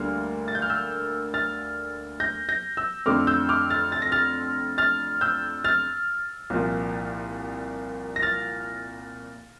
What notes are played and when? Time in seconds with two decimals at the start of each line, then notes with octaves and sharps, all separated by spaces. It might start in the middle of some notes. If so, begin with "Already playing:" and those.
Already playing: D2 D3 G3 A#3 F6
0.48 A6
0.55 G6
0.62 F6
0.70 E6 G6
1.34 F6 A6
2.20 G6 A#6
2.49 G6 A#6
2.77 E6 G6
3.06 F2 D3 A3 C4 D6 F6
3.27 E6 G6
3.49 D6 F6
3.70 F6 A6
3.92 A6
4.02 A#6
4.12 F6 A6
4.78 F6 A6
5.21 E6 G6
5.64 F6 A6
6.50 C2 A#2 F3
8.16 A#6
8.22 F6 A6